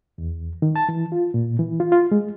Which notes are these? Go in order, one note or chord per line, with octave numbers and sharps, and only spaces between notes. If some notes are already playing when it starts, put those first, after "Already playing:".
E2
D#3
A5
E3
F4
A#2
E3
F4
F4
G#3